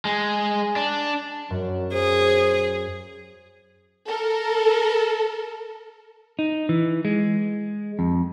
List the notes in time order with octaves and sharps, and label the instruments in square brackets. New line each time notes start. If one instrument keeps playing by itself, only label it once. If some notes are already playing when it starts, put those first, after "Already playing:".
[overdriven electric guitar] G#3
D4
[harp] F#2 [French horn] F#3
[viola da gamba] G#4 [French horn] C5
[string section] A4 A#4
[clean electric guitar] D#4
E3
G#3
F2